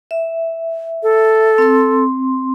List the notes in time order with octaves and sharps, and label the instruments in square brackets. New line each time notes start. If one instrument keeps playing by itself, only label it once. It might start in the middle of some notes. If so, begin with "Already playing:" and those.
[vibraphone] E5
[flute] A4
[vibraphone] C4 C6